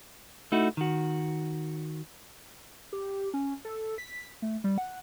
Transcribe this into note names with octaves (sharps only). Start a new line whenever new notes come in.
A3 D#4 E4 F#4
D#3 F#4
G4
C#4
A4
B6
A3
G3
F#5